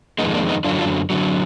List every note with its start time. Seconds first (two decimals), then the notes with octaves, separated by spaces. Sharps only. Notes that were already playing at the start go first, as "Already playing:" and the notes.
0.19 F2 D#3 G#3 B3 D#4
0.34 A#3 D4
0.49 B3 D#4
0.64 F#2 D3 F#3 D4 F4
0.79 D4 F4
1.10 F#2 D3 F#3